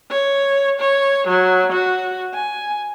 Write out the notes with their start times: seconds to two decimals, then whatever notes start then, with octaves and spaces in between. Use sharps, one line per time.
0.11 C#5
0.80 C#5
1.27 F#3
1.72 F#4
2.34 G#5